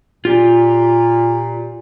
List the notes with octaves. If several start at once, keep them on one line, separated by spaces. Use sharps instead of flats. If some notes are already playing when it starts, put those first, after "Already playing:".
A#2 F4 G4